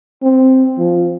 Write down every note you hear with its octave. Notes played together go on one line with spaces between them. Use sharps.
C4
F3